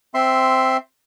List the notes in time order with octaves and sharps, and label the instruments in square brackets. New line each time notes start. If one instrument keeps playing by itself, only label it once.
[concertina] C4 E5 C6